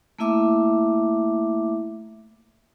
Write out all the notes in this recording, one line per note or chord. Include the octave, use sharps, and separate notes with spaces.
A3 A#3 E4 E5 D6